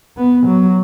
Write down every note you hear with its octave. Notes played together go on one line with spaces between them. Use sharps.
B3
F#3